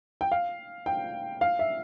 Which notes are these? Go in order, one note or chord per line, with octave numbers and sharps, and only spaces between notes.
G5
F5
G5
F5
E5